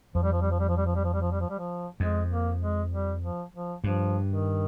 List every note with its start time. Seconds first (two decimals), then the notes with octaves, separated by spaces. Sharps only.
0.15 F2 F3
0.23 G3
0.33 F3
0.42 G3
0.51 F3
0.60 G3
0.68 F3
0.77 G3
0.86 F3
0.96 G3
1.04 F3
1.14 G3
1.22 F3
1.32 G3
1.41 F3
1.50 G3
1.59 F3
2.00 F2 G#3
2.30 A#3
2.61 G#3
2.92 G3
3.22 F3
3.53 F3
3.84 G2 F3
4.30 D#3